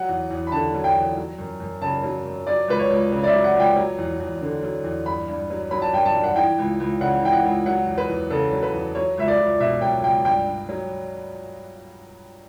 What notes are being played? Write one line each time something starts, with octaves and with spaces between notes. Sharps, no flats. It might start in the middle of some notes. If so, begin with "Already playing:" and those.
Already playing: F#3 F#5
E2
E2
B5
D3 A5
F#3
G5
E2
F#3
F#2
F#2
C#3 A5
F#3
F#2
F#3 D5
C#2 B4
C#5
C#2
C#3
D5
E5
F#3
F#5
C#2 G5
F#3
E2
E2
D3
F#3
E2
G2 B5
G2
F#3
F#3 B5
A5
G2 G5
A5
G2
F#5
E3 G5
C#2
C#2
C#3 F#5
E3 G5
F#5
C#2
F#3 F#5
E2
B4
E2
C#3 A4
F#3
B4
E2
F#3 C#5
C#2 E5
D5
C#2
B2 E5
F#3 G5
C#2 G5
G2 G5
G2
F#3